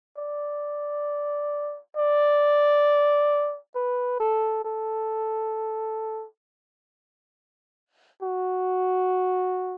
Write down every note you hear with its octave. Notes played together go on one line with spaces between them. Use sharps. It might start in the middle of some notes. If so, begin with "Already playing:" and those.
D5
D5
B4
A4
A4
F#4